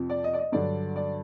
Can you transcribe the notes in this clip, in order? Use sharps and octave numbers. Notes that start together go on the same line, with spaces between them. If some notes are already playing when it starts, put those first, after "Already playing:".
Already playing: F2 C3 F3
D5
D#5
D5
D#5
G2 D3 F#3 D5
D5